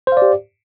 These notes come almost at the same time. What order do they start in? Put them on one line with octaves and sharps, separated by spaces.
C5 F5 D5 G4